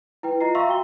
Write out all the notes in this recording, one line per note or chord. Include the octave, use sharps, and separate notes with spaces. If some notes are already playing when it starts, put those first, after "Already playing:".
E4 B4 G5
F4 D#5 A#5 C7
E5 F5 A#5 C6 C#6 E6
F#4 G5 G7